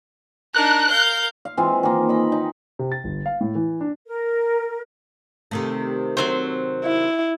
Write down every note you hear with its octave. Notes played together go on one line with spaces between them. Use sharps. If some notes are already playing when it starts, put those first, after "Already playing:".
D4 D#4 A#4 F#6
A#4 F5 G6
F5
E3 G#3 C4 F4
D#3 A#3
D#5 B5
D#4
C3
A6
G1
F5
A2
E3
D4
A#4
C3 D#3 A3
F#3 C4 C5
E4